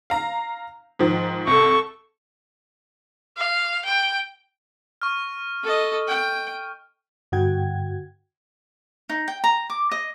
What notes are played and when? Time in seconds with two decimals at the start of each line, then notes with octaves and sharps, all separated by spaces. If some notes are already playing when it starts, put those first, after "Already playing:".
0.10 F5 A#5
0.99 G#2 D#3 F3
1.47 C2 A4 C#6
3.37 F5
3.85 G5
5.02 C#6 F6
5.63 A4 D#5
6.08 G5
7.32 G2 D3 F#4 F#5 G5 G#6
9.09 D#4
9.28 G5
9.44 A#5
9.70 D6
9.92 D#5